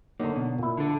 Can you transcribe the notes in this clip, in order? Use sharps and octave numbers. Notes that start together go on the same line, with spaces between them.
D3 F#3 A#3 D#4
B2
A#2 E4
D3 A4